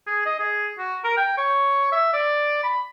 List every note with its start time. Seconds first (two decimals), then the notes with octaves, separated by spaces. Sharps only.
0.07 G#4
0.26 D#5
0.39 G#4
0.78 F#4
1.04 A#4
1.17 G5
1.38 C#5
1.92 E5
2.13 D5
2.63 B5